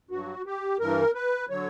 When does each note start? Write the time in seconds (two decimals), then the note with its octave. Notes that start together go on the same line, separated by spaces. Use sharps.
0.10 G2 F#3 F#4
0.46 G4
0.80 G2 E3 A#4
1.14 B4
1.50 D3 F#3 C#5